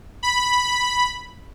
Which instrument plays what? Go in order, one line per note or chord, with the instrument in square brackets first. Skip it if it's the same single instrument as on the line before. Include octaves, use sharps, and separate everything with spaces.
[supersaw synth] B5